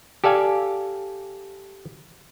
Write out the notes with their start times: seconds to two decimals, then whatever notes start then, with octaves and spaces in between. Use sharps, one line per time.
0.24 G4 A4 D5 F5 G#5